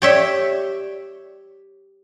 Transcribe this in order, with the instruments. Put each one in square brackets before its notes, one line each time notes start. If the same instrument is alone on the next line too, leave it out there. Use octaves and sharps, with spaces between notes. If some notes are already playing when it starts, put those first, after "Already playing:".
[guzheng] G4 C#5 E5